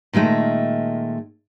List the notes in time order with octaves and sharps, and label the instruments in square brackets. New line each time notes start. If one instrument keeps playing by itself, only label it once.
[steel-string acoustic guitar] A#2 D#3 G#3 A3